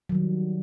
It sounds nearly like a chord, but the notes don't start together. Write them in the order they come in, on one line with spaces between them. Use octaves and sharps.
F#3 D#3 G3